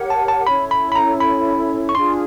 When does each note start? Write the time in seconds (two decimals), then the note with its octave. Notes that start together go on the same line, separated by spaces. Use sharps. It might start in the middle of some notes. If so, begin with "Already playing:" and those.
Already playing: G4 A#4 C#5 F#5
0.10 A5
0.28 A5
0.46 C#4 E4 A4 C#5 B5
0.71 B5
0.92 B5
0.95 A#5
1.20 B5
1.89 C#6
1.95 D4 F4 G#4 C6